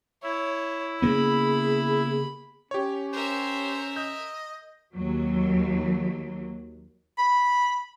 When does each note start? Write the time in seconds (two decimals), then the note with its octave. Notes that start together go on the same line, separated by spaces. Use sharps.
0.23 E4 C#5
1.02 C#3 A#3 B3 G#4 B5
2.71 C#4 G4 C#5
3.13 A#4 C5 E5
3.96 D#5 G6
4.93 D#2 F#3
7.18 B5